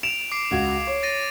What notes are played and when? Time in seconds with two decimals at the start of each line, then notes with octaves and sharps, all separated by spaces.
0.03 D7 E7 F7
0.32 D6 C7 D7
0.51 C#2 F#4 G#6
0.87 C#5
1.03 A6 A#6 D#7